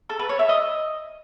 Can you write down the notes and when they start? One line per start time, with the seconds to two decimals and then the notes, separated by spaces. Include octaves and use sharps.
0.10 A4
0.19 B4
0.29 C#5
0.39 E5
0.49 D#5